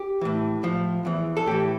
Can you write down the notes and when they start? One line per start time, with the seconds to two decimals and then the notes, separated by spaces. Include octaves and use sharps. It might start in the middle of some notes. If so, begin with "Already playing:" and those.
Already playing: G4
0.21 A2 E3
0.63 A2 F3
1.05 E2 E3
1.37 A4
1.46 A2 E3 G4